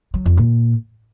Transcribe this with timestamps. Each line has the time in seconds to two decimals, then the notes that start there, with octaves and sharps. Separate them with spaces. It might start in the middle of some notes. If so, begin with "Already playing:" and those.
0.14 F#3
0.26 F2
0.37 A#2